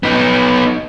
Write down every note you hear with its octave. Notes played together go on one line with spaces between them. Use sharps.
B3 D#4